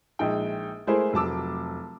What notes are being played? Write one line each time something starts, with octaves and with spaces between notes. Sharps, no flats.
A#1 G#3 D#4 G5
G#3 A3 E4 G#4 A#4 C5
F1 F#3 A5 D6 E6